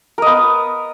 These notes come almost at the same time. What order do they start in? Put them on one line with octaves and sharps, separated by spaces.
A#4 D#5 B3